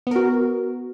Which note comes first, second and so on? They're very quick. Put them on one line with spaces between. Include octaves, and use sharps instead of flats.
B3 A#4 F#4